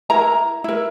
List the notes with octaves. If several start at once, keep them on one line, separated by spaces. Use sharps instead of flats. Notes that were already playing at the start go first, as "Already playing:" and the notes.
E4 A#4 A#5
E4 A#4